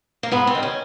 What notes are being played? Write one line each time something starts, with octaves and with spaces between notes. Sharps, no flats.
A#3
G#2 B3
C4
D#3 G3
C#4